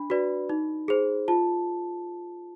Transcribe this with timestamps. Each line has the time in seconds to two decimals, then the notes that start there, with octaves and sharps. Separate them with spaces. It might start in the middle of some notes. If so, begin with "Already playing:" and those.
Already playing: D4 B5
0.10 F#4 B4 D5
0.49 D#4
0.88 G#4 C5
1.28 F4 A5